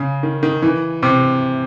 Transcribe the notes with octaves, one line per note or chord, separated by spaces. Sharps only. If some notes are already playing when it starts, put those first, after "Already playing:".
Already playing: C#3
D#3
D#3
E3
C3